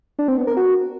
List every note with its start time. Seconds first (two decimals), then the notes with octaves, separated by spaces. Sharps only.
0.19 D4
0.28 C4
0.38 B3
0.47 A#4
0.57 F#4